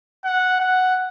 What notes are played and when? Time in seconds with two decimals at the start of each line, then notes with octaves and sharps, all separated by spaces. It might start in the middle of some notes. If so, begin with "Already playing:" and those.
0.24 F#5
0.59 F#5